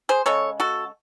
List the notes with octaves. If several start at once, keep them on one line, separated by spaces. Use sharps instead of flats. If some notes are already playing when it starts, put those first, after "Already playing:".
G#4 C5
C#3 G#3 A4 C#5
F#4 A4